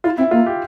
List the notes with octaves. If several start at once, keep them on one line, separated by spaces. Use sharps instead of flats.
E4 F4
C4 E4
A#3 F4
G4